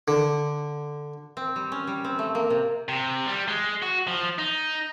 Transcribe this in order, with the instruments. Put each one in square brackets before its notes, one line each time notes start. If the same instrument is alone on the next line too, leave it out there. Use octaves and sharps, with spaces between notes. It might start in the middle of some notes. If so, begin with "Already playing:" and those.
[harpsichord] D3
[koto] C4
G3
C#4
G3
C4
A3
A#3
C3
[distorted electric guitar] C3
G3
G#3
F#4
F3
D#4